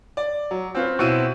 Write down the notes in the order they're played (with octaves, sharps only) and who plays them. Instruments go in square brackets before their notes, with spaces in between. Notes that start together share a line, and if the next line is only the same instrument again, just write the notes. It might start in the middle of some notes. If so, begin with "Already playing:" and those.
[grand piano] D5
F#3
C4 C#4 F4 B4
B2 C4 E4 D#7